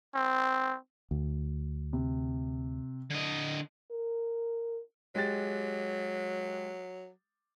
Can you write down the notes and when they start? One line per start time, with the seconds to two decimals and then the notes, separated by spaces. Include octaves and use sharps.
0.15 C4
1.11 D2
1.93 C3
3.11 D3 D#5
3.91 A#4
5.15 F#3 G#3 G4 A6